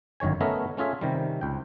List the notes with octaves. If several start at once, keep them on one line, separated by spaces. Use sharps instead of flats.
G1 F#2 D#3 C#5 G#5
A3 B3 C#4 A#4 D#5 E5
A3 C#4 F4 G#4 E5
C3 D#3 G3
C#2 G5